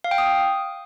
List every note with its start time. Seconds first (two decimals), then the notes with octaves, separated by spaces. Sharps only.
0.04 F5
0.11 G5
0.18 D#6